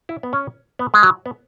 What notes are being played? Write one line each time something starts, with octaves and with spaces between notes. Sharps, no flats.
E4
B3
C#4
B3
G#3
F#3
B3